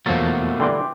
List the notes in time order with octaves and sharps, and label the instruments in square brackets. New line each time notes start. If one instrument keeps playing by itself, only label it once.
[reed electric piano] E2 A6 [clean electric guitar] B2 A3 A#3 [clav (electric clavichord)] F3 F#3
[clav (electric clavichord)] D3 E3 G3 [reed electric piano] G5 C6 D6